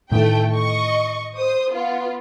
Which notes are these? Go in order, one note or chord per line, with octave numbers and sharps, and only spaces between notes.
A2 D#3 E3 A3 G5
D#5 C#6
C5 D#6
B3 F4